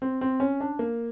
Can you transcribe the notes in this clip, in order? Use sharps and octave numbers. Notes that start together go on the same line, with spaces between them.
C4
C4
C#4
D4
A#3